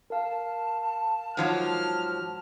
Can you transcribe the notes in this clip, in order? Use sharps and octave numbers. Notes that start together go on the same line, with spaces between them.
A#4 F5 A5
G#2 F3 F#3 F6